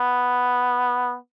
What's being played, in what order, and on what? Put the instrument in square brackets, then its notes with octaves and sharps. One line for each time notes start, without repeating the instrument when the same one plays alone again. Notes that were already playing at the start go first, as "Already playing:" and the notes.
Already playing: [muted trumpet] B3